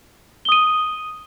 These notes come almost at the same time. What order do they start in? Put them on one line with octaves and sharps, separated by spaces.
G7 D#6 D#7